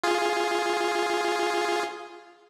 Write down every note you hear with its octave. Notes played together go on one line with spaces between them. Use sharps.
F4 G#4